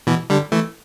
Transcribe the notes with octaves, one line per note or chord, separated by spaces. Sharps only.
B2 E3
D3 G3
E3 A3